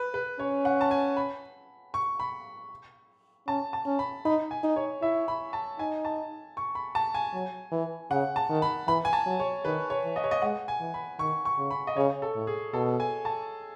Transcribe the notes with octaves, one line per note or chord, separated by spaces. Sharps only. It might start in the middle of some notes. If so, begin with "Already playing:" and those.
Already playing: B4
B4
C#4 C#5
F#5
A5
G#5
B5
C#6
B5
C#4 A5
A5
C#4
B5
D#4 B5
G#5
D#4
C#5
E4 E5
B5
A5
D#4 G#5
A5
C#6
B5
A5
G#5
F#3
E3
C#3 F#5
A5
D#3
B5
E3 B5
G#5
A5
F#3
C#5
D#3 B4
C#5
E3
D#5
C#5
D#5
G#3 F#5
G#5
E3
B5
D#3 C#6
C#6
C#3
B5
D#5
C#3 C#5
A4
A2
G#4
B2 A4
G#5
A5